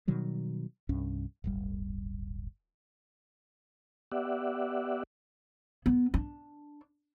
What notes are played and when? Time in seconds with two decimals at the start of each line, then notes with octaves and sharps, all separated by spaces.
0.07 B2 D#3 F#3 G3
0.89 C2 G2 C#4
1.44 D1 G1 G3
4.12 B3 G4 D5 E5 F#5
5.86 B3
6.14 D4